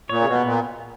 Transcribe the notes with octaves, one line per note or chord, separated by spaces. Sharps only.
A#2 C#5
C#3
B2
B3
A#2